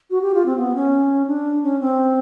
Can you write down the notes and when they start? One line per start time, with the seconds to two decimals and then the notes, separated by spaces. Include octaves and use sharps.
0.11 F#4
0.22 G4
0.34 F4
0.46 C4
0.57 B3
0.75 C#4
1.27 D4
1.63 C#4
1.80 C4